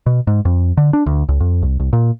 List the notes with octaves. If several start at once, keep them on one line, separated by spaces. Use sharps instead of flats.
B2
G#2
F2
D3
D4
D2
C#2
F2
C2
C2
A#2